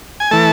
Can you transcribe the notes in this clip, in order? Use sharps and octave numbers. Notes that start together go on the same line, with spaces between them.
G#5
E3 A3 A5